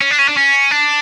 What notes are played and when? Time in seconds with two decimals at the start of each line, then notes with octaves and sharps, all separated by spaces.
0.02 C#4
0.11 D4
0.19 C#4
0.29 D4
0.37 C#4
0.71 D4